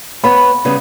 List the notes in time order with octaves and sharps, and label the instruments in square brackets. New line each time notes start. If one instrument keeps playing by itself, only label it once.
[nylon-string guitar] B3 C#5 [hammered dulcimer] B5
[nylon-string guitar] C#3 G3 B3